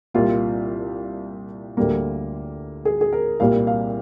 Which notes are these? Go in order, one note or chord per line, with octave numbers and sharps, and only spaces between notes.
C2 A#2 G3 A#3 F4
D2 D3 G3 A#3
G#4
G#4
A#4
C2 A#2 G3 A#3 F5
F5